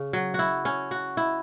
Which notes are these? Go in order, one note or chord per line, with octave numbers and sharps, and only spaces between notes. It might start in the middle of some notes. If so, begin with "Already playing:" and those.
Already playing: C#3
F#3
E4 F#4
C#4
F#4
E4